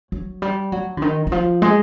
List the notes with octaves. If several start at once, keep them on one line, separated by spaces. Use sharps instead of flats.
F#3
G3
F#3
D3
D#3
E3
F3
G#3